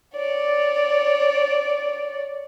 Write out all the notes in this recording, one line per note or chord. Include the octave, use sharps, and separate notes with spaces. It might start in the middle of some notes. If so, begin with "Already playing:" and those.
C#5 D5